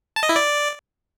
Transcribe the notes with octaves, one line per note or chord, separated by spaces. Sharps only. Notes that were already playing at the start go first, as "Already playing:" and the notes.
A5
D#5
E4
D5